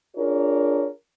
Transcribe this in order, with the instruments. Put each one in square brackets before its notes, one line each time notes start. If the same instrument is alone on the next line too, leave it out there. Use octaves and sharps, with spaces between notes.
[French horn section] D4 F4 G#4 A#4 C#5